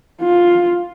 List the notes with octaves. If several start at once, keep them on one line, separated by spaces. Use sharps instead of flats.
F4